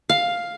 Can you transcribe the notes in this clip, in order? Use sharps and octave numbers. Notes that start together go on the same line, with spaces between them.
F5